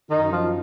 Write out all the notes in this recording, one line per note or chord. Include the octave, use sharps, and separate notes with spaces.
F#2 D#3 D#4
F3 F4